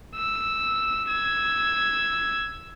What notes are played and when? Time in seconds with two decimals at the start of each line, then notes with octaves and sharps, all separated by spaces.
0.16 E6
1.08 E6 G#6